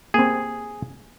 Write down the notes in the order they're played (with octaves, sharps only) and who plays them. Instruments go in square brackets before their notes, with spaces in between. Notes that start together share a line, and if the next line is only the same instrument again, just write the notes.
[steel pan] A#3 C4 [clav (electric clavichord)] G#4